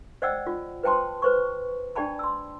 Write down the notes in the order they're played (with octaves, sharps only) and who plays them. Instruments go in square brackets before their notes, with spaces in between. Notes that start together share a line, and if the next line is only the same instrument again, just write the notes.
[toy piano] C5 D5 D#5 F#5 G5 E6
F4
B4 C5 G5 A5 C6
B4 C5 C#6
D4 G4 D5 G5 A5 B5
C6 E6